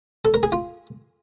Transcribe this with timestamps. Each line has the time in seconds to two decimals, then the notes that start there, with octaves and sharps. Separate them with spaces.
0.25 A4
0.34 A#4
0.43 G#4
0.52 F4